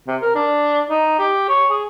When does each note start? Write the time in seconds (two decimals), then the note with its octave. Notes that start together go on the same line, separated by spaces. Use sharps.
0.07 C3
0.21 A#4
0.35 D4
0.89 D#4
1.19 G4
1.49 C#5
1.70 G#4